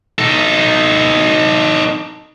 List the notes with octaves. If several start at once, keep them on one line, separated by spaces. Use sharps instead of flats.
D#4 A4